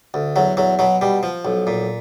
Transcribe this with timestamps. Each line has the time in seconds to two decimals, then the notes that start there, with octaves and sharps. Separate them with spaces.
0.14 D2
0.36 E2 F#3
0.57 E2 F#3
0.79 B2 F#3
1.01 B2 G3
1.23 F3
1.45 B1
1.67 A#2